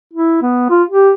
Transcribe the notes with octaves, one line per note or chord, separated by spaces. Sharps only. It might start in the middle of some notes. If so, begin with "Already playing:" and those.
E4
B3
F4
G4